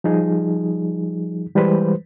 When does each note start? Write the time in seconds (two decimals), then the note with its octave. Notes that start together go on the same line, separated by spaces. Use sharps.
0.04 F3 G3 D#4 G#4
1.55 E3 G3 G#3 B4 C5